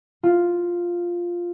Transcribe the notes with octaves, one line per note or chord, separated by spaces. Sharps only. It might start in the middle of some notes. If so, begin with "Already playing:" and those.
F4